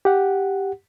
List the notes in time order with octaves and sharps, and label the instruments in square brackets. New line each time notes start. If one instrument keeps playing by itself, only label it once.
[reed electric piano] G4 F#5